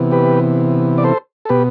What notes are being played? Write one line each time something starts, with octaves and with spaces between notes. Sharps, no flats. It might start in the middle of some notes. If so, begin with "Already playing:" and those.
Already playing: C3 E3 B3
G4 B4
D5
A4 C5
A4
B2 B3 G4 B4